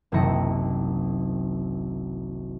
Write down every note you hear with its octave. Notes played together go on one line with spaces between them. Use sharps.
F#1 C2 D#3 E4 A#5 C#7